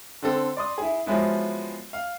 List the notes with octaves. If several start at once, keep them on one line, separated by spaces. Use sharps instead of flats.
D3 C4 A4
D5 C6 D#6
E4 G#4
F3 F#3 G#3 B3 E4
F5